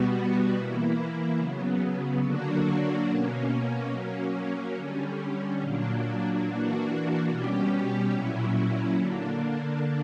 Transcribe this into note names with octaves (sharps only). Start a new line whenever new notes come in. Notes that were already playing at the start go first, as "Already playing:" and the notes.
Already playing: B2 G3 B3 F#4
E3 A#3 E4
C#3 F#3 B3
D3 F#3 A#3 D4 F#4
B2 A#3 C#4
F#3 A#3 C#4
D3 G3 C#4
A#2 F#3 A#3 D4
E3 A#3 D4 F#4
B2 G3 C#4 G4
A#2 F#3 C#4 E4
D3 A#3 D4